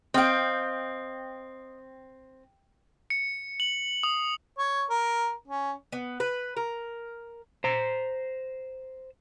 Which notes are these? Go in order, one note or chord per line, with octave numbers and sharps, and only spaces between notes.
C4 D#5 F5 G5
C#7
F#7
D#6
C#5
A#4
C#4
B3
B4
A#4
C5 A#5